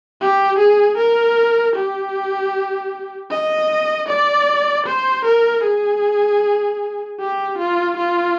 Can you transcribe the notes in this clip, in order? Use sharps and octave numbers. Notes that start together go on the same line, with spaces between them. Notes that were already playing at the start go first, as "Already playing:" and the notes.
G4
G#4
A#4
G4
D#5
D5
C5
A#4
G#4
G4
F4
F4